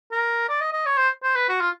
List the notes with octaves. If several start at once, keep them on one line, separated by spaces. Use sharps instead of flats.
A#4
D5
D#5
D#5
C#5
C5
C5
B4
F#4
F4